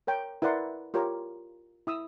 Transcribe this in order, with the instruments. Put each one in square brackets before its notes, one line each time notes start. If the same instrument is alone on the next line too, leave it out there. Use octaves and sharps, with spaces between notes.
[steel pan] A#4 C#5 G5
E4 A#4 B4 D5 F#5 C6
F4 G4 A#4 C#5
E4 D#6 E6